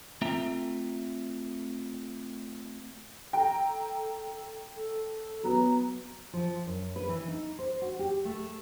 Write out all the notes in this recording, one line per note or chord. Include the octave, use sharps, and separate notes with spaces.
A3 C4 F4 E5 A#5
A4 G5 A#5
A4
F#3 B3 A#5
F3
F#2
B4
E3
D#4
C5
F#4
G4
A3